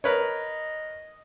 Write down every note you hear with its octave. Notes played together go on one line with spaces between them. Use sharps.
A#4 B4 C#5 D#5